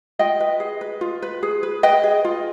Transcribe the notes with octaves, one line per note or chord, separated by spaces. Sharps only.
F4 D#5 G5
B4
G#4
B4
F4
B4
G#4
B4
B4 D#5 G5
G#4
F4